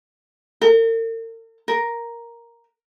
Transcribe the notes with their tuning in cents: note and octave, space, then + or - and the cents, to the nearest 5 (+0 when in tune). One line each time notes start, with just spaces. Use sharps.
A#4 -45
A#4 +5